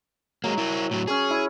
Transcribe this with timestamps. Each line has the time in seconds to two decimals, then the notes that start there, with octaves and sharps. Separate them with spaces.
0.44 F#3 G#3 A#3
0.58 E4 A#4
0.91 A2 F#3
1.08 C#4 G#4 C#5
1.30 E4